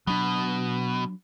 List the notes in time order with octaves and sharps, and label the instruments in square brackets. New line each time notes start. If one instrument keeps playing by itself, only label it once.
[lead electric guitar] B2 [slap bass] F#3 D4